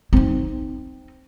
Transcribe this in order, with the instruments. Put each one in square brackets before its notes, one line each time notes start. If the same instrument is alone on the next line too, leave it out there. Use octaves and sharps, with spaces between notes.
[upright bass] C4 D#4